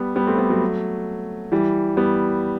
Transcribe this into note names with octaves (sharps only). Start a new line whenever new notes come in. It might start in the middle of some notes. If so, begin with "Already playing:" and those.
Already playing: G3 B3
G3 B3
A3 C4
G3 B3
F#3 A3
E3 G3
G3 B3